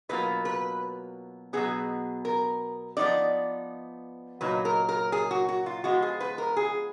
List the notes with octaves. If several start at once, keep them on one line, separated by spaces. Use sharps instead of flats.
B2 F#3 A#3 F4 B4
B4
B2 F#3 B3 G#4
A#4
F3 B3 D#4 D5
A#2 F#3 A#3 D#4 B4
A#4
A#4
G#4
F#4
F#4
F4
F3 G#3 B3 F4 F#4
G#4
B4
A#4
G#4